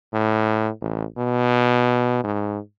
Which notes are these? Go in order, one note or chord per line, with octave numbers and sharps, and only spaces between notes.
A2
A1
B2
G#2